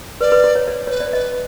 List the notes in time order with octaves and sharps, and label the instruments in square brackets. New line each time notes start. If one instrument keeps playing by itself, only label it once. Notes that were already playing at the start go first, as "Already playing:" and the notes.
[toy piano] B4 [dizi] D5
[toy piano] B4
C5
C#5
D5
[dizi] B4 [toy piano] C#5
[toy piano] D5
[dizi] B4 [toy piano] D#5